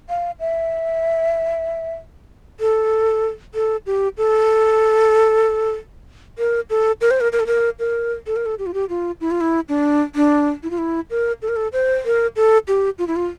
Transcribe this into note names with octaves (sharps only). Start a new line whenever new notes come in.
F5
E5
A4
A4
G4
A4
A#4
A4
A#4
C5
A#4
A#4
A4
A#4
A#4
A4
A#4
A4
G4
F4
G4
F4
E4
F4
E4
D4
D4
E4
F4
E4
A#4
A4
A#4
A4
C5
A#4
A4
G4
F4
E4
F4